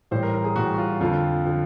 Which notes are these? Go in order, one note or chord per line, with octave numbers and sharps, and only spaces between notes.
A2 E3 G3 C5
A#4
A#4
G#4
A2 E3 G3 F#4
F#4
F4
F2 D3 F3 F4
D3 F3